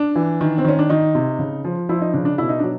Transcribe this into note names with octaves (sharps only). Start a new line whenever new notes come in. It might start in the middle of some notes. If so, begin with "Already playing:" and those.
Already playing: D4
E3
D#3
C4
D#3 C#4
D4
D#3 D#4
C3
C#3
F3
F3 E4
D#4
C#3 D4
D4
B2 E4
D#4
F#3 D4